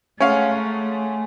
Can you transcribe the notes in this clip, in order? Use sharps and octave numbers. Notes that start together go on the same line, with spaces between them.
G#3 A3 C#4 F5 F#5 A#5